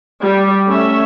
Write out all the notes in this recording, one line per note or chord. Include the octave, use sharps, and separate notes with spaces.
G3
A3 C#4 E5